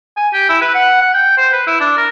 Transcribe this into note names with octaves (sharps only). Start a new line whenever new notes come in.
G#5
G4
E4
B4
F#5
F#5
G5
C5
B4
E4
D4
A#4